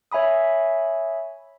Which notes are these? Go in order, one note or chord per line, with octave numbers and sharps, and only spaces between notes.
C#5 E5 G#5 B5 D#6